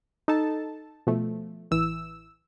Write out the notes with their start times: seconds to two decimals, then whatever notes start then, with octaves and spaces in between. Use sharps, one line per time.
0.28 D#4 A4 A5
1.07 B2 F3 A3
1.71 A1 E3 E6